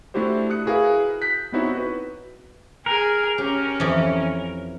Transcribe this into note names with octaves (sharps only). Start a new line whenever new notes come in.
A3 D4 E4 F#4 G4 C5
D#6 F#6 C#7
E4 F#4 G#4 A#4 B4 F5
F#6 G6 B6
B3 C4 D#4 E4 F#4 C#5
F#4 B4
G#4 A#4
C#4 G4
F2 E3